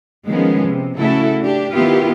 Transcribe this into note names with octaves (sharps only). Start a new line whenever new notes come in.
D#3 F3 G#3 B3 C#4
C3
C#3 A3 E4 F#4 A4
D4 G4
D#3 B3 E4 F4 G4